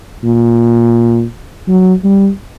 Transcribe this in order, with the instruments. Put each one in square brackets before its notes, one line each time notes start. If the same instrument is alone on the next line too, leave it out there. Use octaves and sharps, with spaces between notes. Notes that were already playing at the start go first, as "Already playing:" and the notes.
[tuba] A#2
F#3
G3